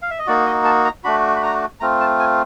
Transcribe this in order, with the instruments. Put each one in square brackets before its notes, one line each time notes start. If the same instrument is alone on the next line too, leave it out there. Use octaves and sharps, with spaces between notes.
[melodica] F5
E5
D#5
A#3 D#4 F#4 D5
D#5
A5
A#5
A3 D4 F#4 B5
B5
A#5
A3 C4 F4 A#5
A5
G#5